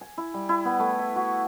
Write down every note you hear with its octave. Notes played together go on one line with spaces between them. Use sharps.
G#5
E4
G3
E4
B3
A3
E5
F#4